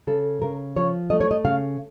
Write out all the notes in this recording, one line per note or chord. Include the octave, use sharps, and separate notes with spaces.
C#3 A4
C#3 A#4
F3 C#5
A3 D#5
C#5
D#5
C#3 F5